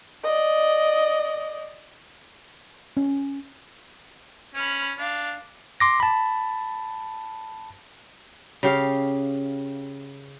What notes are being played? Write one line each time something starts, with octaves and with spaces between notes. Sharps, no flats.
D5 D#5
C#4
C#4 B5 F6
D4 F5
C6 D6 A#6
A5 B5
C#3 G4 F5